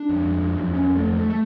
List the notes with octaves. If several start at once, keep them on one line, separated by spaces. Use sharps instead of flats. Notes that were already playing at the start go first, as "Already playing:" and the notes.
Already playing: D4
F2
F2
F2
F2
F2 C#4
F2
A3
F2
A3
A3